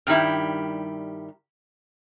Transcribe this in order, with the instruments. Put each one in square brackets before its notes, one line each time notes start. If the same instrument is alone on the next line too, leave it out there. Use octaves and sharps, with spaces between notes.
[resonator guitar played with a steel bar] G2 D#3 G3 E4